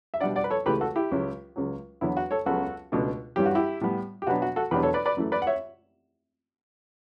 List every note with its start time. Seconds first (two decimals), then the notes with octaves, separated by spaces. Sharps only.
0.14 E5
0.20 B2 G3 D4 D5 F#5
0.36 D5 F#5
0.44 B4
0.50 A4 C#5
0.66 C#2 C#3 E3 A3 G4 B4
0.81 F#4 A4
0.96 E4 G4
1.12 C#2 C#3 F#3 C#4
1.56 C#2 C#3 F#3
2.01 E2 D3 F#3 B3 E4
2.17 F#4
2.31 A4 C#5
2.46 C#2 C#3 F#3 B3 F#4 A4
2.92 C#2 B2 A3 D4
3.36 G2 E3 G3 C#4 G4
3.46 F#4
3.55 E4 G4
3.81 A2 G3 B3
4.22 G4
4.27 B2 F#3 B3 D4 F#4
4.42 F#4
4.56 F#4 A4
4.71 E2 B2 F#3 B3 D4 G4 B4
4.83 A4 C#5
4.94 B4 D5
5.06 B4 D5
5.17 F#2 E3 A3
5.32 B4 D5
5.42 F#5
5.47 C#5 E5